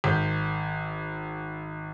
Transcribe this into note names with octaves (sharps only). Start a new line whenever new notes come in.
G#1 G6